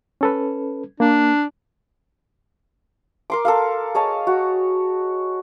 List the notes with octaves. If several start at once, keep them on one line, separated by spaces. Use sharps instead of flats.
C#4 A4 B4
A#3 D4
A#4 C6 D6
A4 A#4 F5
G#4 C#5 D#5 A5
F#4